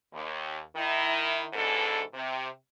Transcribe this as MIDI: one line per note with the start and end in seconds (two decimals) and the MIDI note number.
0.13 0.61 39
0.75 1.47 51
0.75 1.47 64
1.54 2.01 44
1.54 2.01 47
1.54 2.01 52
1.54 2.01 62
1.54 2.01 69
2.14 2.48 48